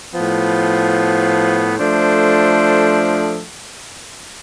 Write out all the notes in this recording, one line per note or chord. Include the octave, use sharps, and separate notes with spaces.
A2 F3 B3
F3 A3 D4 A4 C5